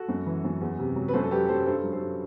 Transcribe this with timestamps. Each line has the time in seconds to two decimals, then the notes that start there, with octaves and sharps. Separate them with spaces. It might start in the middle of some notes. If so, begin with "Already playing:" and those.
Already playing: F#4 A4
0.08 F#2
0.26 E3
0.44 F#2
0.61 E2
0.79 C3
0.96 F#3
1.08 B4
1.13 F#2 A4 C5
1.24 A4
1.31 F#3 G4 B4
1.48 F#2 A4 C5
1.66 G2 A4 C5
1.84 F#3
1.92 A4 C5
2.01 G2